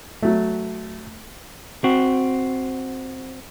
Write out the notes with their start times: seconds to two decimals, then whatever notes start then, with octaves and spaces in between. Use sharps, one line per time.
0.23 F#3 A3
1.84 C4 F#4